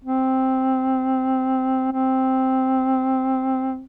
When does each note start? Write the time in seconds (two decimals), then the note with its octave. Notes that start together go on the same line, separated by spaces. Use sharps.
0.05 C4
1.93 C4